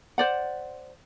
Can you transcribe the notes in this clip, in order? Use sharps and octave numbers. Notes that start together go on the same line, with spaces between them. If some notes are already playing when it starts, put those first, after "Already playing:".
C5 D5 F#5